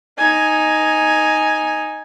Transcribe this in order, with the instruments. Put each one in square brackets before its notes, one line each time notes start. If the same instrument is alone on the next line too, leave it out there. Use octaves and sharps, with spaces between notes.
[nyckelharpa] D#4 G#5